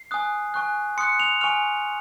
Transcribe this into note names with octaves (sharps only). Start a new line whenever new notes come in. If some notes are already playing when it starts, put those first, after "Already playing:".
Already playing: C7
G#5 D#6 F#6
G#5 C#6 F#6
C6 D#6 F#6 C#7
F7
G#5 C#6 F6 F7